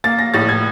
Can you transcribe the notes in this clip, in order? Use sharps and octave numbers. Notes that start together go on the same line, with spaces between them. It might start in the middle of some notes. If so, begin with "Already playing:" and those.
A#3 A6
A#6
A2 A6
G#6